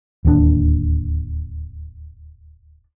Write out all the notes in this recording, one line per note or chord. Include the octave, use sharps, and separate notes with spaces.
D1 D#2 D#3 D4